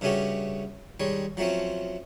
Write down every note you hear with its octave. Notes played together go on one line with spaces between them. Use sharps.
G2 C#3 A3 C#4 F#4 G4
D#3 G3 G#3 C#5
F3 F#3 A3 C4 C#4